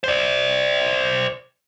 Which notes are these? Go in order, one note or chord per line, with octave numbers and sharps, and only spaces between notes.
C5 D5